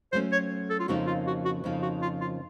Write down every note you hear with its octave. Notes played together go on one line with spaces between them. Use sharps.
F#3 A3 C#4 C5
C#5
A4
F4
F2 C#3 F3 A#3 D#4 F#4
F4
F#4
F#4
F2 C#3 F3 A#3 D#4
F#4
F4
F4